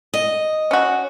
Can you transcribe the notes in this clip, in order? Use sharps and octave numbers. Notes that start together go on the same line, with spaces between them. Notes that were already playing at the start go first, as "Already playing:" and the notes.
D#5
C#4 F#4